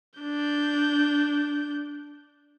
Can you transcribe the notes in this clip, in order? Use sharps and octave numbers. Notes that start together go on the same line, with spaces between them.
D4 G6